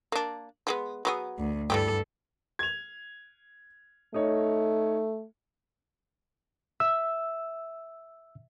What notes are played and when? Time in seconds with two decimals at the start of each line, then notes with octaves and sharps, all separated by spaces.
0.12 A#3 D4
0.67 F3 G#3 B3
1.05 F#3 B3 G#4
1.38 D2
1.70 G2 E3 G3 G4 A4
2.59 G#6 F7
4.14 A3 D#4 C#5
6.80 E5 E6